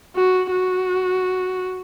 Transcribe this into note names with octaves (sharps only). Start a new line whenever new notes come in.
F#4
F#4